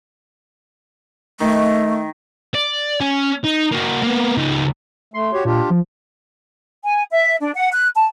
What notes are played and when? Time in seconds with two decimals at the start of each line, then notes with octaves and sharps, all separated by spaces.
1.40 D#3 A3
2.54 D5
3.00 C#4
3.44 D#4
3.72 A#3 F#4
4.02 A#3 B3
4.37 C#2 D#4
5.14 A3 C6
5.33 F#4 G4 C#5
5.45 A#2 D4 F4 G4
5.70 F3
6.84 G#5
7.11 E5
7.41 D4
7.54 F#5
7.72 F#6
7.95 A5